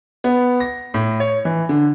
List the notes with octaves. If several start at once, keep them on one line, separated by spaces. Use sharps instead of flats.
B3
A#6
A2
C#5
E3
D3